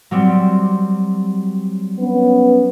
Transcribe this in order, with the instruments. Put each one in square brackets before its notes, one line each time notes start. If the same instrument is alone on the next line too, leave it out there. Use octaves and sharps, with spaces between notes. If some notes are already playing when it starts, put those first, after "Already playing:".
[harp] F#3 G3 C4
[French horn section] B3 C#4